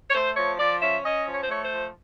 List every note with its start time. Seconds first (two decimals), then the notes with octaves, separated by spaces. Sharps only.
0.10 C#5
0.14 A3 C5
0.37 F3 C#5
0.59 F3 D5
0.82 C#4 E5
1.04 C#4 D#5
1.27 F3
1.34 C#5
1.42 C5
1.49 A3 C#5
1.64 C5
1.72 F3